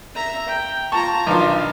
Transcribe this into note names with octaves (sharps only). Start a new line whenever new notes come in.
E5 A#5
G5
F4 A5 A#5 C#6
B1 D#3 D4 F4